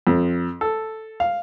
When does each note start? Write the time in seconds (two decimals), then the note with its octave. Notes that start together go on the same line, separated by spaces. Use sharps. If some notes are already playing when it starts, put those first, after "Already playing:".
0.07 F2
0.61 A4
1.20 F5